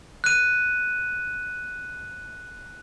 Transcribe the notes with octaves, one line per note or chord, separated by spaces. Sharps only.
F#6 D#7